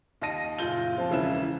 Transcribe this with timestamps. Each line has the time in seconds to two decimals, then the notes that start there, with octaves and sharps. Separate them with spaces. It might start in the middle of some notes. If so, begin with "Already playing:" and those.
0.21 D#2 D#5 A5 A#6 D#7
0.59 F#1 A#2 F4 G6 G7
0.97 F3 C4 F4
1.10 E1 C#3 E3 E4 B4 E7